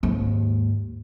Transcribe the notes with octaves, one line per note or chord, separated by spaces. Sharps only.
D#2 G#2